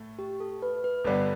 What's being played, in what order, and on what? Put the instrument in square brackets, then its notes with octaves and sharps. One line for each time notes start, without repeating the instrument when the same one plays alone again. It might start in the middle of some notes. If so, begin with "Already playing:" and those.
Already playing: [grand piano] A2 A3
[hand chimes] G4
A4
B4
B4
[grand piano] G1 G2 D3 G3 B3 [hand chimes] B4